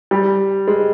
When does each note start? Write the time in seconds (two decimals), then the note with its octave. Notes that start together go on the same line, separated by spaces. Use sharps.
0.11 G3
0.68 G#3